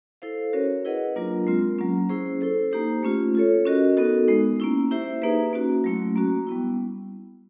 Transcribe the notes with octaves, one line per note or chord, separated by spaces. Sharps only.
E4 A4 C5 F5
C#4 F#4 A#4 C#5
E4 G#4 B4 D#5 F#5
F#3 A#3 D4 F4 A#4
G#3 C4 F4
F#3 A#3 C#4
C#4 E4 G#4 C5
E4 A4 C5
A#3 D#4 G4 C5
A3 C#4 F4
F4 A4 C#5
C#4 F#4 A#4 D#5
B3 D#4 F#4 A4
G#3 B3 D#4
A#3 C#4 E4
E4 G4 C5 E5
A#3 D#4 G#4 B4 E5
A#3 C#4 F#4
F#3 A3 C#4 E4
A#3 C#4 F#4
G3 B3 E4